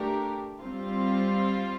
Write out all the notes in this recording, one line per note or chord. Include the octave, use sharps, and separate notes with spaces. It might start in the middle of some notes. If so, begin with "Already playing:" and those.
Already playing: A3 D4 G4 A#4
G3 C4 F4